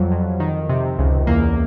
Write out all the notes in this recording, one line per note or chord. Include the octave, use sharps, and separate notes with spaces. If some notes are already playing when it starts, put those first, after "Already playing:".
Already playing: F2 F#3 G3
F2
D#3
C3
C#2
E2 A#3